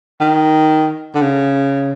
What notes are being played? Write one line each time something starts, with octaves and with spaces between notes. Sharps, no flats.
D#3
D3
C#3